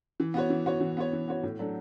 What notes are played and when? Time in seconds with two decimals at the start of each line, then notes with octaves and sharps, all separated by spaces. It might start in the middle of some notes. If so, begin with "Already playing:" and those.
0.20 E3
0.34 B3 F#4 C#5
0.50 E3
0.66 B3 F#4 C#5
0.81 E3
0.97 B3 F#4 C#5
1.13 E3
1.28 B3 F#4 C#5
1.43 A2
1.59 F#3 A3 D4 A4